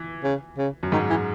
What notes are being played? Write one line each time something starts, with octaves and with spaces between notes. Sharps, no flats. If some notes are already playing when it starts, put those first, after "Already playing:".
Already playing: E3
C#3
C#3
F#2
G#2 D#3
E3